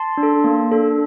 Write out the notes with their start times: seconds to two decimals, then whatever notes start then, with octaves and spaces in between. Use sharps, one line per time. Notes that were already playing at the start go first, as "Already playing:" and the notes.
Already playing: A5 C6
0.17 D4
0.23 A4
0.44 A#3
0.72 D4 A4